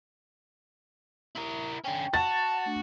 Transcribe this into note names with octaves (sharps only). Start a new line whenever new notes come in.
E4 A#4
D3 C#4 G5
F#4 F#5 A5 A6
A3 D4